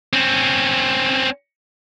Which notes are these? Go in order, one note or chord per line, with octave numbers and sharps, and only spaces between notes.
C4 C#4